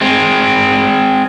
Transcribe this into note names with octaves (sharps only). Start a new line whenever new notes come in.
G#3 C4